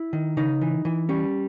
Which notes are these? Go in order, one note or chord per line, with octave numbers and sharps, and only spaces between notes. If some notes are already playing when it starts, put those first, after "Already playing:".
Already playing: E4
D#3
C#3 D#4
E3
E3
G3 C#4